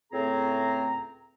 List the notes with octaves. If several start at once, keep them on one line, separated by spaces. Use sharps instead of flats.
C#2 A2 A3 C4 G#4 A#5